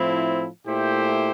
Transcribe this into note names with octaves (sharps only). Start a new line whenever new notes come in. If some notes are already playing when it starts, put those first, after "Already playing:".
Already playing: A2 F3 C4 E4
A#2 A3 E4 G4 C5